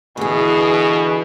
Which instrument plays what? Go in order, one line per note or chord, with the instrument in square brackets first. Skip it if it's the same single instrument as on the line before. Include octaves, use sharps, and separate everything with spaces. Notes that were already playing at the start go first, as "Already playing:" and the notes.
[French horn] B2 [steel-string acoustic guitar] D3 E3 [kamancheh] G#4